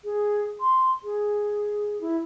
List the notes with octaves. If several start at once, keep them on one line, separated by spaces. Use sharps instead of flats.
G#4
C6
G#4
E4